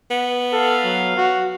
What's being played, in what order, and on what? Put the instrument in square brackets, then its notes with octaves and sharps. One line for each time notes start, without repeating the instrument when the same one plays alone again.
[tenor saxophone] B3
[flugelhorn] A4 [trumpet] F5
[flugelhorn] F#3
F#4